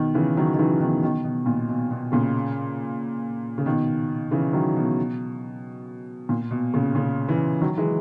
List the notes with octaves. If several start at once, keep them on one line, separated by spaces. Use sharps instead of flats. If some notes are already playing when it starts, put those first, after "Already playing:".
Already playing: B2 D#3
C#3 E3
D#3 F#3
D#3
C#3 E3
B2 D#3
B2 D#3
B2
A#2
B2
B2
A#2 C#3
C#3
B2 D#3
C#3 E3
D#3 F#3
B2
A#2
B2
A#2 C#3
A#2 C#3
C#3 E3
D#3 F#3
E3 G#3